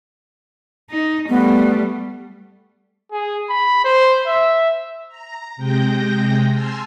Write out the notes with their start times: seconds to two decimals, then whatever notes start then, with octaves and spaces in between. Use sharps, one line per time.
0.90 D#4
1.29 G3 A3 B3
3.12 G#4
3.49 B5
3.84 C5
4.27 E5
5.08 A#5
5.56 C3 G#3 G5 G6 A#6
6.52 G#5 A5 C6 E6 F6